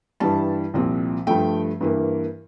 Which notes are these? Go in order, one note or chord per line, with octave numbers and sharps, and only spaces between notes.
G2 E3 G3 A5
C2 A#2 F3 C4
G2 F3 A3 G5
G2 E3 A#3